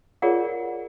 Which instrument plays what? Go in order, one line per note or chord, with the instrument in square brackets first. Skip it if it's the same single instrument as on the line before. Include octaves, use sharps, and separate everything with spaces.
[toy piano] F4 G#4 A#4 C#5 D5 F#5